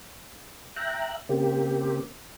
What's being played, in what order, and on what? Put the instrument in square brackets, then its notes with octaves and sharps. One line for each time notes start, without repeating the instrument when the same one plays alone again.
[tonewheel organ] E5 G5 A#5 F#6
C#3 A#3 C4 G4